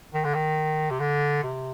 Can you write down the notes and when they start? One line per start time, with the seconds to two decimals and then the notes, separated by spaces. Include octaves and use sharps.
0.14 D#3
0.24 D3
0.34 D#3
0.90 C3
1.00 D3
1.43 C3